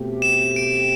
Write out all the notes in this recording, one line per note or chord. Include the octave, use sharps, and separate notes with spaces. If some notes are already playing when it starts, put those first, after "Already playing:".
Already playing: B2 A3 C4 G4
E7
D7